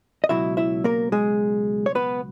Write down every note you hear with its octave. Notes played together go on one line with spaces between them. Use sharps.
D#5
C#2 B2 F#3 E4 E5
E4 E5
A#3 A#4
G#3 G#4
C#5
B3 B4